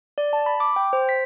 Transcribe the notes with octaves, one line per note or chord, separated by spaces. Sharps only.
D5
A5
B5
D6
G5
C5
B6